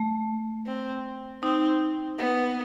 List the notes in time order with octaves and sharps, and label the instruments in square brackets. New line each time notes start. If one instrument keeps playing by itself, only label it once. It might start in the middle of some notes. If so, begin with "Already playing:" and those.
Already playing: [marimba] A3
[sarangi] C4
[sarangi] C4 [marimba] D#4
[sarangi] B3